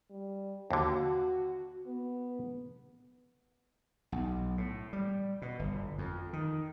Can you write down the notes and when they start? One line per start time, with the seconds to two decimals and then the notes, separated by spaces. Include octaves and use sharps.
0.10 G3
0.71 D#2 D3 F#4
1.87 B3
4.12 B1
4.57 A2
4.93 G3
5.42 B2
5.59 G1
5.98 F2
6.33 D#3